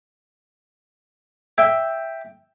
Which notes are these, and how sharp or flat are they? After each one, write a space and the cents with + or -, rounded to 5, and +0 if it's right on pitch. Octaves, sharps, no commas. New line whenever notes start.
E5 +0 G5 +5